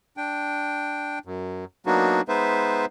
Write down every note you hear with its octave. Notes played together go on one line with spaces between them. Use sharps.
D4 G5
F#2
F#3 A#3 B3 D4 D#4 F#4
G#3 B3 D#4 B4 C5 E5